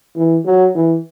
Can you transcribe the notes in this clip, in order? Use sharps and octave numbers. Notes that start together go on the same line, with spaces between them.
E3
F#3
E3